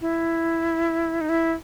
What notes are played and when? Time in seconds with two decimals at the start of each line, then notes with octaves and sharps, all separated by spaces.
0.01 E4
1.21 D#4
1.29 E4